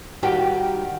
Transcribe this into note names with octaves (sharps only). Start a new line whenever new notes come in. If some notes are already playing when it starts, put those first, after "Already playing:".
D#3 G3 F#4 G4 F5 G5